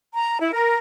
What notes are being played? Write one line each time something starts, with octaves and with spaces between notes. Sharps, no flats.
A#5
E4
A#4